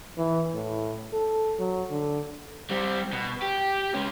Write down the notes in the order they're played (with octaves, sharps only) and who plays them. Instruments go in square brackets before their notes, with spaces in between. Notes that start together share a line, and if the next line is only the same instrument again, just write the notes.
[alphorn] E3
A2
A4
F#3
D3
[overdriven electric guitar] G3 C4
B2
G4
C#2 C#4